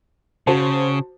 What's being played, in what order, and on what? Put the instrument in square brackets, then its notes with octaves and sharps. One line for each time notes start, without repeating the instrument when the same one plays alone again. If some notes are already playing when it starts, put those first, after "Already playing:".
[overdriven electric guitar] C#3 [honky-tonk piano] F#4 C5 A5